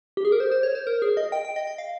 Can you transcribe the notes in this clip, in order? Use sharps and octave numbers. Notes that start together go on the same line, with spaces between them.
G4
G#4
A#4
C5
C5
C#5
C5
A#4
G#4
D#5
G5
G5
D#5
D#5
F5